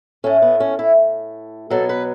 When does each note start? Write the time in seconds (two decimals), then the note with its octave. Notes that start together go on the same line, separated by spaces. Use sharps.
0.24 A2 A3 C#4
0.42 B3
0.60 C#4
0.79 E4
1.70 B2 F#3 B3 A4
1.89 B4